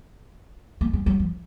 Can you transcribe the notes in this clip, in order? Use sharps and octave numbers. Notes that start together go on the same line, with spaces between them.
A#3
G#3
F#3
F3